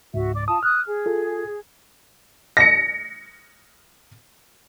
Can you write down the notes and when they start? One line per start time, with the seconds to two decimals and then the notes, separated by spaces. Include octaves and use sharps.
0.14 C#2 G#2 F#4 E5
0.35 D5 D6
0.48 F4 A5 D#6
0.63 D#6 F6 F#6
0.87 G#4
1.06 F4 A4
2.57 A#6 C#7